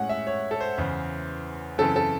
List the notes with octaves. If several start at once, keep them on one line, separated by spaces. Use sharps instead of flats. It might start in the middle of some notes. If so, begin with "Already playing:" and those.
Already playing: A2 G#3 C#4 F#5
E5
C#5
A4
C5
E2 C#3 E3
F#2 C#3 E3 C4 A4
A4